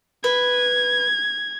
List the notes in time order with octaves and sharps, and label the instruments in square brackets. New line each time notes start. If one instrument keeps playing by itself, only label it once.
[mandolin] B4 [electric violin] G#6